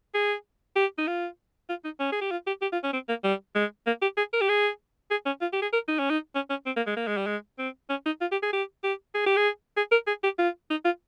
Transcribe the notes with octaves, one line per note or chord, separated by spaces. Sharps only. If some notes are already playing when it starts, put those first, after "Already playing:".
G#4
G4
D#4
F4
F4
D#4
C#4
G#4
G4
F4
G4
G4
F4
C#4
C4
A#3
G3
G#3
A#3
G4
G#4
A#4
G4
G#4
G#4
C#4
F4
G4
G#4
A#4
D#4
C#4
D#4
C#4
C#4
C4
A#3
G#3
A#3
G#3
G3
G#3
C4
C#4
D#4
F4
G4
G#4
G4
G4
G#4
G4
G#4
G#4
A#4
G#4
G4
F4
D#4
F4